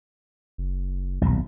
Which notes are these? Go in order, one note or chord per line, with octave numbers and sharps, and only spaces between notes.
F#1
D#1 B1